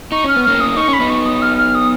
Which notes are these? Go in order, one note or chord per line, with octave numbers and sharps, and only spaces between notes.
D#4 C#6
C#4 F6
B3
A#3 C#4 F6
D#6
D#4 C#6
C#4
B5
B3 D#4
C#6
D#6
F6
F6
D#6